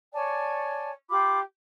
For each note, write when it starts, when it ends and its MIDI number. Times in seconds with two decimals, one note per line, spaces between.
0.13 0.91 73
0.13 0.91 74
0.13 0.91 80
0.13 0.91 81
1.09 1.40 65
1.09 1.40 67
1.09 1.40 83
1.09 1.40 86